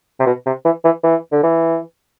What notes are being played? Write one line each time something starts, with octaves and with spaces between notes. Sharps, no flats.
C3
B2
C3
E3
E3
E3
D3
E3